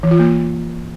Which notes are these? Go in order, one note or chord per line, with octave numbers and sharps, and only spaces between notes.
E3
F4
A#3